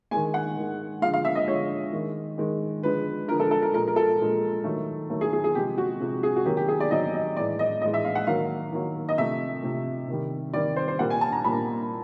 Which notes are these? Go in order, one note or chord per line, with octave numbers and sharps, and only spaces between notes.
D#3 G#3 G#5
F#5
D#3 G#3
D3 F3 G#3 F5
F5
E5
D#5
D3 F3 G#3 C#5
D#3 G#3
D#3 G#3
D3 F3 G#3 B4
D3 F3 G#3 A#4
A4
A4
A#4
A#2 F3 G#3 A#4
A#4
A4
A#2 F3 G#3
D#3 F#3 A3
D#3 F#3 A3
G#4
G#4
G#4
C3 F3 G#3 G4
F#4
C3 F3 G#3
G#4
F#4
D#3 F#3 A#3 G4
G4
G#4
D5
D#3 F#3 A#3 D#5
D#5
A2 E3 G#3 D5
D#5
A2 E3 G#3 D#5
E5
F5
F#5
D#3 F#3 A#3 F5
D#3 F#3 A#3
D#5
C3 F3 A3 E5
C3 F3 A3
C3 D#3 G3
C3 D#3 G3 D5
C5
C5
A#2 G3 A#3 F#5
G#5
A5
A#5
A#2 G3 A#3 B5